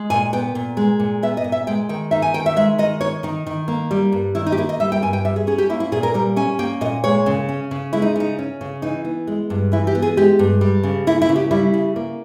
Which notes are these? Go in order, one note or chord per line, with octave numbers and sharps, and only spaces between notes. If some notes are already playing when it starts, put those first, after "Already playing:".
Already playing: G#3
A#2 G#5
B3 G5
A#2
G#3
A#2
B3 E5
D#5
A#2
E5
G#3 G5
D#3 G5
D#4 E5
G#5
D#3 G5
E5
G#3 E5
D#3 D#5
D#4 C#5
D#3 D#4
D#3
A#3
G3
G2
D#3 E4
D#4
G4
A#3 E4
D#5
G3 E5
G5
G2 G#5
G5
G3 E5
G#4
C#4 G#4
G4
A#3 E4
E4
A#2 G#4
A#4
G3 A#4
C#4 G#5
A#3 G5
A#2 D#5
G#3 C#5
C#3
C#4
C#3
G#3 E4
D#4
C#3 D#4
C#4
C#3
E3 D#4
B3
G#3
G2
E3 E4
G4
B3
G#4
G#3 G4
G2
G3
C#3
A#3 E4
E4
C#3
G4
G3 E4
C#3
A#3